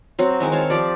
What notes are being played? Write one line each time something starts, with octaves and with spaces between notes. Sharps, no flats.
F#3 C4 F#4
D#3 G#3 E4
C4 C#5 F5 A5
F3 G4 D5